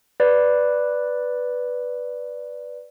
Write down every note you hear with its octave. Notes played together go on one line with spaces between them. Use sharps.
B4 D5